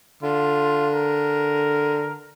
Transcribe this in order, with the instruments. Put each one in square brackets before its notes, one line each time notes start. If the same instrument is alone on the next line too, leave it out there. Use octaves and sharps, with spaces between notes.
[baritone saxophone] D3 [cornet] F4
[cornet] A#4